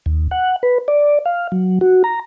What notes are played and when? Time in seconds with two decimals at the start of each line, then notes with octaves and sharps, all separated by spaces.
0.06 D#2
0.31 F#5
0.63 B4
0.88 D5
1.25 F5
1.52 F#3
1.81 F#4
2.04 A#5